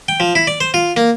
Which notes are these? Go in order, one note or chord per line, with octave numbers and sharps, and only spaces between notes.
G5
F3
E4
D5
C5
F4
A#3